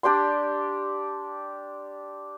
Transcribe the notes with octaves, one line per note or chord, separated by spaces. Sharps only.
D4 G4 D5 C6